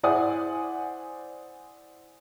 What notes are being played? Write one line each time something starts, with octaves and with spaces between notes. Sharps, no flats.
E4 C5 D5 F#5 G#5 D#6